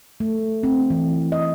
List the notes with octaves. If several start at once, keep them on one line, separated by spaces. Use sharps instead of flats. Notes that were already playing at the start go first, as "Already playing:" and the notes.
A3
C4
E3
D#5